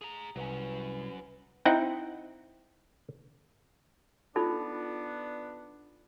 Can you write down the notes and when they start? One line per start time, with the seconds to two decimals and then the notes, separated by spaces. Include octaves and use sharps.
0.01 G#4 A#5
0.36 C2 F#3 C#4 B4
1.65 C4 D#4 E4 F#5 G5
4.36 B3 D4 D#4 F4 A4